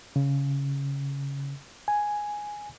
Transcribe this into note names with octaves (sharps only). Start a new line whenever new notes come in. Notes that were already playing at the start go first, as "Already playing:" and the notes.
C#3
G#5